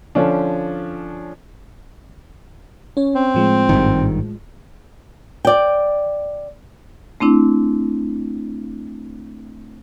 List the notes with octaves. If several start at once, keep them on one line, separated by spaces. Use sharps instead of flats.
D3 F3 C#4 D4
C#4 C#5
C4
A2 F3 G#3
G#1 G2 D#3
D5 G5
A3 C4 D4 E4